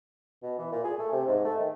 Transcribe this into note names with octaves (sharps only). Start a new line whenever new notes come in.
B2
E3
A#2
G#4
A3
C3
G#2
A3
D#3